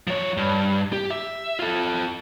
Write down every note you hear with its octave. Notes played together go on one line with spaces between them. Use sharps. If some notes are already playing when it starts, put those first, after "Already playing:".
F3 C#5
G2
G4
E5
F4 A4